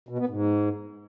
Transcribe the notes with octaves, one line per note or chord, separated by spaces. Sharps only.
B2
B3
G#2